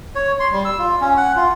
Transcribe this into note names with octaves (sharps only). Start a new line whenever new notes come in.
C#5
C6
G3
E6
F4
C#4
F#5
F4